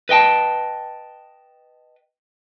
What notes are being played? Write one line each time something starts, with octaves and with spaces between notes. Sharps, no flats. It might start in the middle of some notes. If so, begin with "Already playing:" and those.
B4 D#5 G5 A5